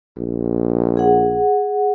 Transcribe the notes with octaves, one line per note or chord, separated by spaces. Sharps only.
A#1
G#4 F#5